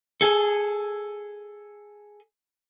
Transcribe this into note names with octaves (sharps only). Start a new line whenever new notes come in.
G#4 A4